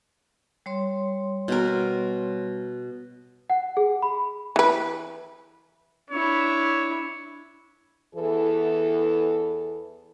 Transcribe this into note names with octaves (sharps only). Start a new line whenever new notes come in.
G3 C#5 C6
B2 A#4
F#5
G#4
B5
E3 B4
D4 E4 C#5
E2 E3 A4